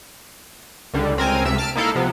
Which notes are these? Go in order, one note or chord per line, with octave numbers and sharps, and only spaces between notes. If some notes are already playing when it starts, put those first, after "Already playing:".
C#2 D3 G3
C#2 C4 A#4 G#5
C#2 C3 E5 E6
A5 F6 D7
A#3 D#4 E4 A4 F5
C3 F3 B3